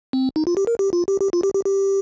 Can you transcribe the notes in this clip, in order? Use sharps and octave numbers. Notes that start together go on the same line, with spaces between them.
C4
D#4
F4
G4
A#4
G4
F4
G4
G4
F4
G4
G4
G4